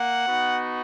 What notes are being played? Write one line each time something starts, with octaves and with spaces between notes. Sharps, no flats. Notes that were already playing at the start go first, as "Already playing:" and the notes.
Already playing: A#3 F#5
B3 D#4 F#4